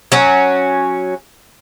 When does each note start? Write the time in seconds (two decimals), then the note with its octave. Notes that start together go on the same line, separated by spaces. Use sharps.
0.12 F#3 C#4